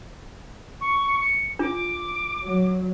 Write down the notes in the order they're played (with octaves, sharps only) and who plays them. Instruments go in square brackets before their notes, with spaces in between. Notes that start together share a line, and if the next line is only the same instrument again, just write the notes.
[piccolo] C#6
C#7
[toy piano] D4 F4 [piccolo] D6
[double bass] F#3